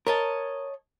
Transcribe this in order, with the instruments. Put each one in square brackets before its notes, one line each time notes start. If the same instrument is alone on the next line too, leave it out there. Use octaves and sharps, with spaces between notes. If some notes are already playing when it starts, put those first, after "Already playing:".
[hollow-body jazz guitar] A#4 [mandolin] C#5 D#5 A5